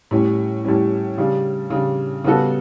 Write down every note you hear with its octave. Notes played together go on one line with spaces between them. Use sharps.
A2 G3 C#4
A2 G3 C#4
C#3 G3 D4
C#3 G3 D4
C#3 G3 B3 F#4 A4